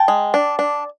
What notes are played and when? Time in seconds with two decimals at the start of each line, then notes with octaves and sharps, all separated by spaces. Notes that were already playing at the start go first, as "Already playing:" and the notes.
Already playing: G5 A5
0.08 G#3
0.34 D4
0.59 D4